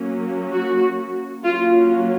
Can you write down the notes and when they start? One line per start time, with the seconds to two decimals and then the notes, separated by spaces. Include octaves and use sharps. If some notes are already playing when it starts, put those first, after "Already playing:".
Already playing: F#3 A#3 C#4
0.51 F#4
1.42 F#3 A#3 C#4 F4